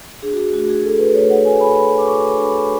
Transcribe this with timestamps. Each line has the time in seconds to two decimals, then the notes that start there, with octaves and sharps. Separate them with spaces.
0.22 D4 G#4
0.33 F#4
0.37 G#4
0.53 A3 F#4
0.69 G#4
0.84 F#4 A4
0.99 B4
1.15 A3 C#5
1.30 F#5
1.45 A3 G#5
1.60 B5
1.76 F#4 B5
1.98 D6
2.07 A3 C#6
2.37 D4 B5